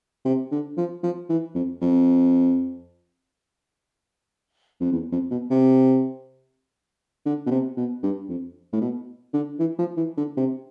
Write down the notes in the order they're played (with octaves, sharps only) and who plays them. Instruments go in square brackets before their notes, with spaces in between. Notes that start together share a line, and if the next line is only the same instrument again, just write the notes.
[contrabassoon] C3
D3
F3
F3
E3
F2
F2
F2
E2
F2
B2
C3
D3
B2
C3
B2
G2
F2
A2
B2
D3
E3
F3
E3
D3
C3